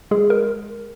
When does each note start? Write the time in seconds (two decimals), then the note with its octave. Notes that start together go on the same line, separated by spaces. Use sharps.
0.11 G#3 G#4
0.30 A#4